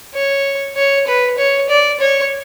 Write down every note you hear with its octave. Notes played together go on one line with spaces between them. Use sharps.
C#5
C#5
B4
C#5
D5
C#5